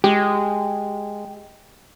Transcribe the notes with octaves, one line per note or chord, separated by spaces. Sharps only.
G#3 G4